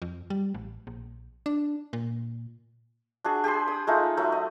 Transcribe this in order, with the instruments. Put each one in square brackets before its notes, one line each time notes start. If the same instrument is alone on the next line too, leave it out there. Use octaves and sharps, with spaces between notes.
[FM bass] F2
G3
A1
A#1
D4
A#2
[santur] D4 F#4 G#4
G4 G#4 B5 C6
D#6
G#3 A3 D#4 F4
F#3 A3 E5
D#5